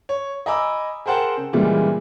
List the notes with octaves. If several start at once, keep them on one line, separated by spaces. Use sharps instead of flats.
C#5
D#5 G#5 A#5 B5 D6 E6
G#4 A#4 C5 F#5 G5 A5
C#3
A#2 C#3 E3 G3 G#3 F4